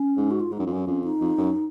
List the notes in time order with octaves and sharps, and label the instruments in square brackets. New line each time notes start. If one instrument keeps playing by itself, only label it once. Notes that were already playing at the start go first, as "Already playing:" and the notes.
Already playing: [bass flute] C#4
[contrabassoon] G#2
[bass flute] F#4
F4
[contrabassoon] G#2 [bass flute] D#4
[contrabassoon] F#2
F2
[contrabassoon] F#2 [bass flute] C#4
[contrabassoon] F2 [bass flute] C#4
[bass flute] D#4
[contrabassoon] F2
F#2